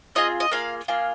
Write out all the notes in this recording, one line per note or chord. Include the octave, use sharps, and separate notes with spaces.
C4 F4 G#4 D#5
D#5
A#3 F4 G#4 F5
A#3 F4 G#4